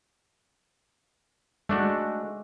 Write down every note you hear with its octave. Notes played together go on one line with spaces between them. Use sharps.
G#3 A3 D4 F#4